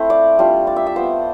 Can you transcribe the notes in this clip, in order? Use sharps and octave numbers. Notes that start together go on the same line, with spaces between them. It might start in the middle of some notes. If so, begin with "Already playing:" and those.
Already playing: A3 C4 E4 C5
D5
G3 D4 F4
D5
E5
E5
B3 F4 C5